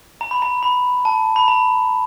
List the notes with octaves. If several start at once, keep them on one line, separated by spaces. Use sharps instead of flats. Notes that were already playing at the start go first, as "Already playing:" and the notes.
A#5
B5
A#5
B5
A5
B5
A#5